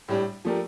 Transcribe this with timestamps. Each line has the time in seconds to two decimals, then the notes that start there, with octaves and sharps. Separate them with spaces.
0.08 A2 G3 D4
0.45 F3 A3 D4 G4 A#4